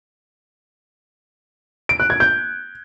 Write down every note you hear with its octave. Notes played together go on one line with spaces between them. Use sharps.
D7
F#6
G#6
G6